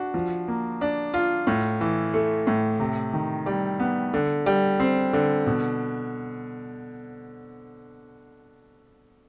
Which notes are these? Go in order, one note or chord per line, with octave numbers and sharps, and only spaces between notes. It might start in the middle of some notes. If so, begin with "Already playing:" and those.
Already playing: D4 F#4
F3
A#3
D4
F4
A2
E3
A3
A2
C3
D#3
G3
B3
D3
G3
C4
D3
B2